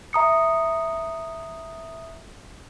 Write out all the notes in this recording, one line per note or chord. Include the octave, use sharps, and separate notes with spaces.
E5 A#5 D#6 C#7